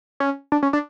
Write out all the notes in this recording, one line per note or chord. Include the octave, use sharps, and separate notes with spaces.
C#4
D4
C#4
D4